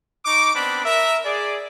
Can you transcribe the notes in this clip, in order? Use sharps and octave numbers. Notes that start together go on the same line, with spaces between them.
D#4 C#6 D6
B3 C4 D4 B5
A#4 E5
G#4 D5